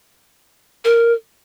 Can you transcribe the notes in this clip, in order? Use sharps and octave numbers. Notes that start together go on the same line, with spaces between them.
A#4